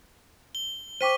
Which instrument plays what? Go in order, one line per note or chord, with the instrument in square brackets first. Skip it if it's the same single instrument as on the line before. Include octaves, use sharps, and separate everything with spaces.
[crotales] G7
[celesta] C5 G5 D6 [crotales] C#6 B6 D#7